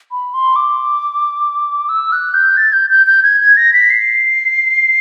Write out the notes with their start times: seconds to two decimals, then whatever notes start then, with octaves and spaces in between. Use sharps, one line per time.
0.11 B5
0.34 C6
0.56 D6
1.89 E6
2.12 F#6
2.34 G6
2.57 A6
2.73 G6
2.90 G6
3.07 G6
3.23 G#6
3.40 G#6
3.57 A#6
3.73 B6
3.90 C7